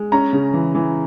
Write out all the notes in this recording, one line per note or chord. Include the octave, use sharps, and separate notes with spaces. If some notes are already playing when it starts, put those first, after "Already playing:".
Already playing: G#3
C#4 A#5
C#3
E3
E3